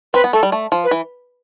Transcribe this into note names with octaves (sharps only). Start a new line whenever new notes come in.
C4 B4
B3
A3 A4
G3
A3
F3
B4
E3